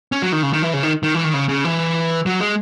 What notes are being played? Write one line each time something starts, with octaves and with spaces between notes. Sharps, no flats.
C#4
F#3
D#3
C#3
D#3
E3
C#3
D#3
D#3
E3
D#3
C#3
C#3
E3
F#3
G#3